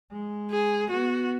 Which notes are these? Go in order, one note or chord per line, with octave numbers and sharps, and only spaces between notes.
G#3
G#4
B3 F#4